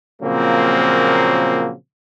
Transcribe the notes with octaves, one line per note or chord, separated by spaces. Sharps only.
A#2 C#3 F3 F#3 A#3 C4